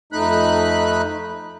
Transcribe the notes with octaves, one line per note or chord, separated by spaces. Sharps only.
F2 A3 D#4 B5 F#6